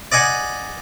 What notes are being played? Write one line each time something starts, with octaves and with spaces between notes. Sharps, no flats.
D5 D#5 F#5 G#5